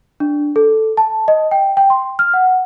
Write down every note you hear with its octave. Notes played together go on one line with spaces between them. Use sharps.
D4
A4
A5
D#5
G5
G5
C6
F6
F#5